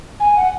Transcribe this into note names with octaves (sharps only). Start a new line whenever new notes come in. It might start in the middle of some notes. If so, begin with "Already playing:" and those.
G#5
F#5